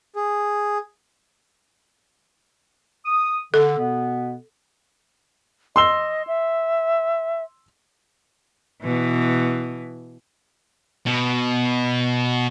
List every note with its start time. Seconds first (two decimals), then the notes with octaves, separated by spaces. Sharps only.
0.16 G#4
3.06 D#6
3.54 D3 A4
3.78 B2 B3
5.76 D#5 C6 E6 G7
6.27 E5
8.82 B2 E3
11.06 B2